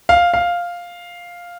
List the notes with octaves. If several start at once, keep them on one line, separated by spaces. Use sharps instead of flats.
F5
F5